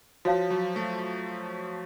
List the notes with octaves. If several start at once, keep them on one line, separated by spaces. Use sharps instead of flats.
F3 F#4 C#5 F5 A5
F#3
A3